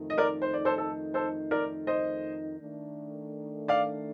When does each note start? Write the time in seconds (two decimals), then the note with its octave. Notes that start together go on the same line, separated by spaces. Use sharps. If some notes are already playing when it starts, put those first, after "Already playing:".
Already playing: F2 D#3 A3 D#4
0.10 D#5
0.18 A#4 D5
0.42 C5
0.53 D5
0.65 A4 C5
0.78 A4
1.14 A4 C5
1.51 A#4 D5
1.87 C5 D#5
2.60 D#3 A3 D4
3.68 D5 F5